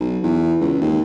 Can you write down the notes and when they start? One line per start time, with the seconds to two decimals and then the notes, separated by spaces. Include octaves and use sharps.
0.01 B1
0.23 E2
0.61 C#2
0.81 D#2